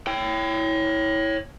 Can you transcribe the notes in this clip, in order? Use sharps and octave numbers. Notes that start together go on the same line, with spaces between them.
C#5 G5